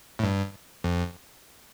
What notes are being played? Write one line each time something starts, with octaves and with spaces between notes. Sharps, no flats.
A2
G2
F2